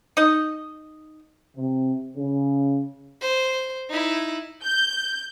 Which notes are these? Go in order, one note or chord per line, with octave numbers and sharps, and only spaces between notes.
D#4 D#5
C3
C#3
C5
D#4 E4
G6